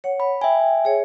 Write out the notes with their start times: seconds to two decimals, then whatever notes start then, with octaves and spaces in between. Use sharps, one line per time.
0.04 C#5 F#5
0.20 B5
0.41 E5 G5 G#5
0.85 G#4 C#5